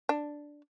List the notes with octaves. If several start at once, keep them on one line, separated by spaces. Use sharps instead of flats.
D4